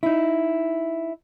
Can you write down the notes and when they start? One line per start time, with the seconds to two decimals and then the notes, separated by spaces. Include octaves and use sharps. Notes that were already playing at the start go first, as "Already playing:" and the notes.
0.03 D#4 E4